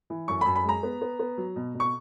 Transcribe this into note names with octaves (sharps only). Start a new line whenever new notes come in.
E3
F#2 C#6
F#2 B5
B5
G#3 A#5
B3
B3
B3
F#3
B2
B2
C#6